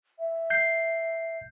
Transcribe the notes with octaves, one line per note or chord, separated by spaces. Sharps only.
E5
G6 C7